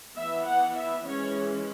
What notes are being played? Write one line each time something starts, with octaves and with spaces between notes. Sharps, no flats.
E3 B3 E5
F#5
E5
E3 G#3 C#4 C#5